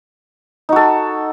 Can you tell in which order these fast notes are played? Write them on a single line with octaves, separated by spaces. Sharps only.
D#4 F#4 A4